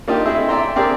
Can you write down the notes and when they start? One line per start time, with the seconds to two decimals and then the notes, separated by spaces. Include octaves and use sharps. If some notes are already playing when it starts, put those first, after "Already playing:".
0.08 A#3 D4 D#4 F4 G4
0.25 A3 C4 E4 G#4 D#5 E5
0.48 D5 E5 G5 A#5 C6
0.76 C4 D4 G4 G#4 A#4 D5